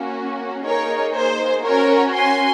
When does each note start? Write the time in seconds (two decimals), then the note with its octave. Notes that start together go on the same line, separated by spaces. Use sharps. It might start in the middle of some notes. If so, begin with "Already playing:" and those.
Already playing: A#3 C#4 F#4
0.66 A#3 D#4 G#4 A#4 C#5
1.15 C5
1.65 C#4 F#4 A#4 C#5
2.16 G#5 C6